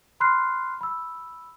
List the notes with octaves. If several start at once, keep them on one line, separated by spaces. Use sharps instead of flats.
B5 C6 F6 F#6 C7
B5 E6